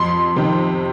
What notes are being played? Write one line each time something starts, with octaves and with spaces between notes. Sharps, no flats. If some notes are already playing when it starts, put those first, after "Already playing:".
Already playing: F2 C6
C3 D#3